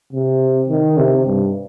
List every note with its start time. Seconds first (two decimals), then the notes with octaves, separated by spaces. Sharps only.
0.13 C3
0.69 D#3
0.98 C3
1.26 G2